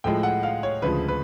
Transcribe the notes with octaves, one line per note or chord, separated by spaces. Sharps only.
A2 F3 G#3 G5
F#5
F5
C#5
D2 C#3 F3 G#3 B4
B4